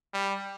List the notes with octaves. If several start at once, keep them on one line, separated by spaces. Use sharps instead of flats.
G3